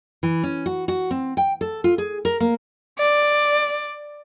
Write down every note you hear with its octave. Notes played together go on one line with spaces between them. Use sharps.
E3
C#4
F#4
F#4
C4
G5
A4
F4
G#4
A#4
A#3
D5